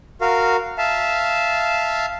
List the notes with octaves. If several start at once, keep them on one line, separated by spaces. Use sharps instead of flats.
F#4 A#4 F5
E5 F5 A5